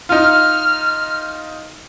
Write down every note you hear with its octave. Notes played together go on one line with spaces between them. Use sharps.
D#4 F4 F6